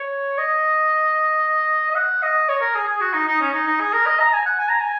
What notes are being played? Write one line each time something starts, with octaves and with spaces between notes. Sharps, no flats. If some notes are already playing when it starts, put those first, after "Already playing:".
Already playing: C#5
D#5
D#5
F#5
D#5
C#5
A#4
G#4
G#4
F#4
D#4
D#4
C#4
D#4
D#4
G#4
A#4
D#5
A#5
G#5
F#5
G#5
A#5
G#5